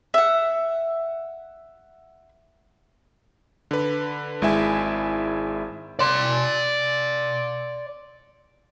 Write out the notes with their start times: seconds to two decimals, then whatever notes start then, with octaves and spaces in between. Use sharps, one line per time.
0.14 E5 F#5
3.71 D3 B4
4.42 G#1 G#3 E4 E5 G#5
5.99 D5 C6